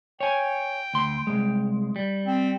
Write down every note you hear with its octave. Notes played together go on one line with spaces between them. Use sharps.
C#5 G5 G#5
D2 C6
C2 G#3
G3
C4